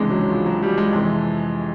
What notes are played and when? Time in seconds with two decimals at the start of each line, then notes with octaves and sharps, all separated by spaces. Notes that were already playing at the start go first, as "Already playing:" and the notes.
Already playing: C#2 C3 E3 G#3 D4
0.10 F#3
0.21 F#3
0.31 F3
0.46 F#3
0.62 G3
0.78 G#3
0.92 F2 C3 E3